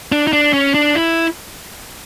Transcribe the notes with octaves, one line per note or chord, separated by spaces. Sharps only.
D4
D#4
D4
C#4
D4
E4